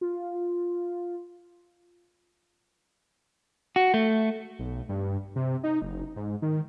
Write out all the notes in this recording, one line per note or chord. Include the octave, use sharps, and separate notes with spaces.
F4
F#4
A3
B1
G2
C3
D#4
F#1
G#2
D#3